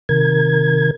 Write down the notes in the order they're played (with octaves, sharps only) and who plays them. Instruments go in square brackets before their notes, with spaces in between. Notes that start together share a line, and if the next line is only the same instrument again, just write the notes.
[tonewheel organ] C3 D#3 A#4 G#6